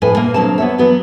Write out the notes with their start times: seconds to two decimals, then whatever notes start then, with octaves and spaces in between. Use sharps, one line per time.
0.02 F2 A2 B4 G#5
0.17 A#2 A#3
0.34 D2 F#3 A#3 C4 A5
0.58 B3 C#5 E5
0.78 E3 F#3 B3